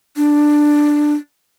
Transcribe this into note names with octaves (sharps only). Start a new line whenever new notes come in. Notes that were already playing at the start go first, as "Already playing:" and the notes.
D4